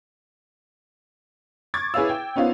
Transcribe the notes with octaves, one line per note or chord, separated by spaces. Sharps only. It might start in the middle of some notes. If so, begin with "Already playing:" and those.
C#6 D6 G#6 A6
E4 G#4 B4 C#5 F5 E6
G5
B3 C#4 D#4 F4 C5 F5